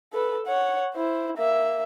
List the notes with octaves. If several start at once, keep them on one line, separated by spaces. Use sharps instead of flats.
A4 B4
C#5 F#5
E4 C5
A#3 E5